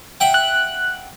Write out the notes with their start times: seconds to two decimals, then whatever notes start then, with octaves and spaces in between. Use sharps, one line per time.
0.20 E5 F#5 G5
0.34 F#6